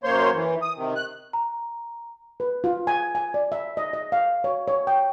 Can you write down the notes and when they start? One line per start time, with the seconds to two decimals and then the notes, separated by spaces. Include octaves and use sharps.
0.04 F#2 A#3 C5 C#5 C6
0.34 E3
0.62 D#6
0.76 C3 D#3
0.96 F#6
1.33 A#5
2.40 B4
2.64 F4
2.87 G#5
3.15 G#5
3.34 D5
3.52 E5
3.77 D#5
3.93 D#5
4.12 F5
4.44 C#5
4.68 C#5
4.87 G5